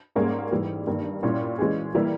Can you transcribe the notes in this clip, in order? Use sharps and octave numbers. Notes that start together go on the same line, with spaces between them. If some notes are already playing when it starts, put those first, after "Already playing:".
G#2 G3 A#3 C#4 G#4
G#2 E3 G3
G2 D#3 A#3
A#2 G3 C#4 E4
E3 G#3 C#4 G#4
E3 G3 A#3 E4